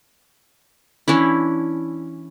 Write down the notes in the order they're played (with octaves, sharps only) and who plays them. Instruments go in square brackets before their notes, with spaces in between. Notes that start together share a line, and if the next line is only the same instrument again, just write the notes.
[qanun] E3 C#4 D4 E4